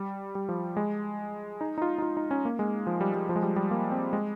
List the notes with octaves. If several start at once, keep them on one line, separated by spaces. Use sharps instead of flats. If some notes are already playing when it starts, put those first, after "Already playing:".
Already playing: G3
G3
F3
G#3
D#4
D#4
F4
D#4
F4
D#4
C#4
A#3
G#3
F3
G3
G3
F3
G#3
G3
G3
A#3
C4
G#3